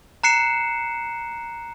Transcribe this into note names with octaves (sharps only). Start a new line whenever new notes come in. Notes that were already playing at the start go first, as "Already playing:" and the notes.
A#5 F#6 C7 C#7 E7